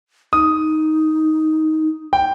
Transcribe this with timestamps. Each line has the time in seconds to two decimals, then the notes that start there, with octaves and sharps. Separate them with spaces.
0.33 D#4 D#6
2.13 G5